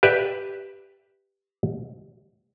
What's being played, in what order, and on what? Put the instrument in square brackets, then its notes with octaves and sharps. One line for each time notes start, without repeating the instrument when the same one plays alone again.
[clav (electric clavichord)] G4 B4 D5 E5